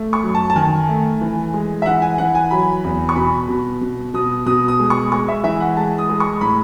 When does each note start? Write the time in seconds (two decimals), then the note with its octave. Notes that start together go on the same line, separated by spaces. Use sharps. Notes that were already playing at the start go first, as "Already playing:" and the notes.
Already playing: A3
0.13 C#6
0.23 F#2
0.35 A5
0.50 A5
0.56 D#3 G#5
0.88 A3
1.21 E3
1.54 G#3
1.82 E5
1.86 E3 F#5
2.02 G#5
2.18 E3 F#5
2.35 G#5
2.51 F#3 B5
2.84 E2
3.09 C#6
3.16 B2 B5
3.49 B2
3.81 B2
4.14 B2 D#6
4.46 B2 D#6
4.68 D#6
4.79 G#3
4.90 C#6
5.11 G#3 C#6
5.28 E5
5.43 E3 E5
5.60 F#5
5.77 G#3 A5
5.98 D#6
6.09 G#3
6.20 C#6
6.41 A2 B5